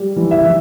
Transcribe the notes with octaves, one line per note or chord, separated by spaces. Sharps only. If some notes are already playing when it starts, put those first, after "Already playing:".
Already playing: G3
E3
E5
E3